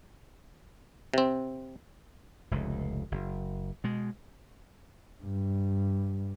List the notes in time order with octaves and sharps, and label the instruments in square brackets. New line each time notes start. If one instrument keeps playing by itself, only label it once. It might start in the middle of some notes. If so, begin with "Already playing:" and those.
[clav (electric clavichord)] C3 C4
[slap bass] F1 C#2
F#1
B2 G#3
[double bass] G2